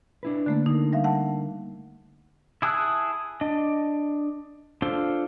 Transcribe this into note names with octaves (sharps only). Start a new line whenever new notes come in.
D4 E4 B4
D3 A3 A#3 D4
D3 A#3 D#4
G3 E5 F5
F#5 A5
E4 G#4 A5 E6 F#6
D4 D#5
D4 F4 A4 C5